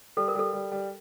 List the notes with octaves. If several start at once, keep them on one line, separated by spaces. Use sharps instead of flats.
G3 A4
A#4
G3 A4
G3
G3